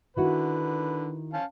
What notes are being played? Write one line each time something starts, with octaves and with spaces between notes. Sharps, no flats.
D3 D#3 E4 F#4 B4
C#4 F5 A5